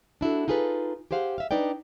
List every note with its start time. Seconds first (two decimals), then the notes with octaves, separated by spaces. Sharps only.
0.21 D4 E4 F#4 A4
0.48 D#4 F4 G#4 A4 B4
1.11 G4 G#4 C5 F5 F#5
1.38 E5 F5
1.51 D4 D#4 B4 D5 G5